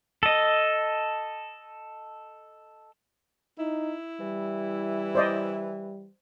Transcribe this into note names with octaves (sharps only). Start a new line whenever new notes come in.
A4 D#5
D#4 E4
E3 G3
C5 D5 D#5